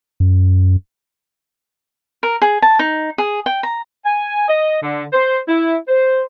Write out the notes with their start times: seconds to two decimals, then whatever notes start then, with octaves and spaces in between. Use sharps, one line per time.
0.20 F#2
2.23 A#4
2.42 G#4
2.62 A5
2.79 D#4
3.18 G#4
3.46 G5
3.63 A#5
4.05 G#5
4.48 D#5
4.82 D3
5.13 C5
5.48 E4
5.88 C5